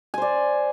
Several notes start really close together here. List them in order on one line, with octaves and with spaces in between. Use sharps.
G#5 C5 D5